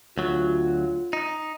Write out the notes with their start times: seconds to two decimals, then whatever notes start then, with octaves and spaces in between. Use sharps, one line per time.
0.18 D2 F#3 F4
1.13 D#4